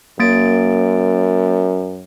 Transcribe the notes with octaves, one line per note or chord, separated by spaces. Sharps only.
F#2 A#3 A6 D7